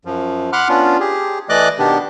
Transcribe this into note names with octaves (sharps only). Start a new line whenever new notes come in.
F#2 F3
F#5 B5 C6 D6 F6 F#6
B3 C#4 D4 F4
G4 G#4
E3 A3 D5 D#5 D6 F#6
B2 D#3 B3 D4 G4